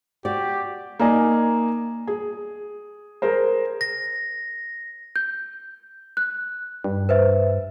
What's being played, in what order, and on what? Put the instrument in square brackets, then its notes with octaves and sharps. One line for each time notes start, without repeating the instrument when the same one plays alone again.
[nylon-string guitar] F#4 D5 [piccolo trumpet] G4
[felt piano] A#3 D#4 D5 G#5
G#4
G#4 A#4 C5
[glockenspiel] A#6
[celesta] G6
F#6
[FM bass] G2
[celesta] B4 C5 E5